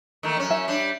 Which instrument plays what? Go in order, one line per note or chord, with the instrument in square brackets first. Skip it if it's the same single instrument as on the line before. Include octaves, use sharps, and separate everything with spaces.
[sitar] D#3 A3 A#3
F#2 C#4
[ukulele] E5
[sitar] G3 D4